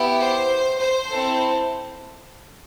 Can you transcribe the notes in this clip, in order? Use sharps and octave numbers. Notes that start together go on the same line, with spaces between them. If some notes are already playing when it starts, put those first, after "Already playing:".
Already playing: B3 E4 G4
C5
C5
C4 E4 A4